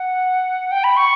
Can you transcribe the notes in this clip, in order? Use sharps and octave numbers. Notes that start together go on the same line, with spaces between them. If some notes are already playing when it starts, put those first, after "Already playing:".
Already playing: F#5
G5
B5
C#6